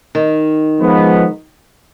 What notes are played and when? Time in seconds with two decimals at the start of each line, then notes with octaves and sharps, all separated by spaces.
0.15 D#3
0.79 F3 G#3 B3